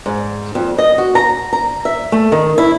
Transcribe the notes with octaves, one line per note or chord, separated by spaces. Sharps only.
G#2
F2
D#5
F#4
A#5
A#5
E5
A3
D#3
E4